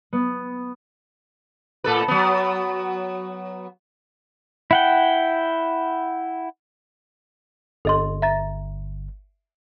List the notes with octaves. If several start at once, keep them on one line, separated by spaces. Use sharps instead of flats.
B3
A2 A4 B4
F#3 B3
E4 F#5 G5
G1 A4 D#5 C6
E5 A#5 A6